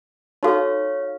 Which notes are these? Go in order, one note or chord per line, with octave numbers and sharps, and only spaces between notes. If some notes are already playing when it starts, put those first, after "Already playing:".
D#4 F#4 A4 C#5 F5